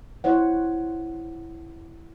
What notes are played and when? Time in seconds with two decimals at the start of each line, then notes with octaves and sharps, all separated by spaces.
0.24 E4 C5 C#5 F#5